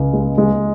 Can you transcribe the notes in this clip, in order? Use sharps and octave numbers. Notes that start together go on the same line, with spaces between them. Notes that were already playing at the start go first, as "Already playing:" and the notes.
Already playing: C#2
G#3
G#3